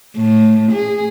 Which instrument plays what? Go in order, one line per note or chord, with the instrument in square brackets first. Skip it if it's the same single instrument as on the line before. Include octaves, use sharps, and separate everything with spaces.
[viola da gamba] A2
G#4